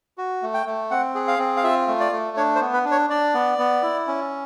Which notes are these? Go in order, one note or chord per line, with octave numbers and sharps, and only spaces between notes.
F#4
A3
G5
A3
C4 F#5
G#4
F5
C4
F5
F4 E5
A3
D5
A3
D4 C#5
C5
B3
B4
D4
C#5
D4 D5
B3
B3
E4
C#4